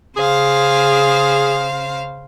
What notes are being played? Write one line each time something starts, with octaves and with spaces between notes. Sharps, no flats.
C#3 G#4 C5 F5